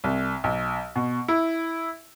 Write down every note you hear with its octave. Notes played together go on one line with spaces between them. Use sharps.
C2
B1
B2
E4